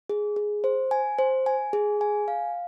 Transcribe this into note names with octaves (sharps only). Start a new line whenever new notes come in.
G#4
G#4
C5
G#5
C5
G#5
G#4
G#5
F5